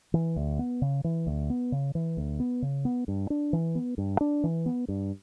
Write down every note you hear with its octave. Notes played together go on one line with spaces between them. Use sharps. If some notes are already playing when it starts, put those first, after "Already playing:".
E3
D2
B3
C#3
E3
D2
B3
C#3
E3
D2
B3
C#3
B3
G2
D4
E3
B3
G2
D4
E3
B3
G2